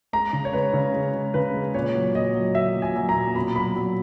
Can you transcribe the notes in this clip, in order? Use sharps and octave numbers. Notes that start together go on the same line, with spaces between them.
G#3 A#5
C#3
C#5
G#3 B4
C#3
G#3
G#3
C#3 B4
G#3
A#2 C#5
F#3
A#2 D#5
F#3
F#3 E5
A#2
G#5
F#3
A#5
A#2
B2 B5
F#3 B5
F#3